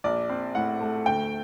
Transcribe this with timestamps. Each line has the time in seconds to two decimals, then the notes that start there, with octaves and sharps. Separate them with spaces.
0.04 A#1 D5
0.30 C4
0.55 A2 F#5
0.81 A3
1.06 D2 G5